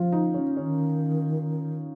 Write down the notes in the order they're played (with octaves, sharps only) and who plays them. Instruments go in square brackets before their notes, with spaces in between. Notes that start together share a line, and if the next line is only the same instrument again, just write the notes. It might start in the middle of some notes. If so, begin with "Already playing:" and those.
Already playing: [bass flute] F3 [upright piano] F4
[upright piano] D#4
C#4
[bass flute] D#3 [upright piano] C#4